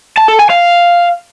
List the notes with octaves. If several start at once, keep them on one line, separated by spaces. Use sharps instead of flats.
A5
A4
G#5
F5